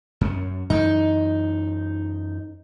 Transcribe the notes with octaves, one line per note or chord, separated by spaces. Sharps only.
F#2 C#4
F#2 E3 D#4